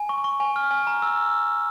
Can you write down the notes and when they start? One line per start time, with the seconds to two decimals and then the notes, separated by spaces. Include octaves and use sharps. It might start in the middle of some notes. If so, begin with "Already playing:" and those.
Already playing: G#5
0.09 C#6
0.24 C#6
0.40 G#5
0.56 F6
0.71 G#5
0.87 A#5
1.02 E6